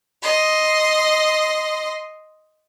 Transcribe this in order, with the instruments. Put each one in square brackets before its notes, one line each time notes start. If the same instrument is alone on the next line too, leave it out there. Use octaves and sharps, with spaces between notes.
[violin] D#5 C6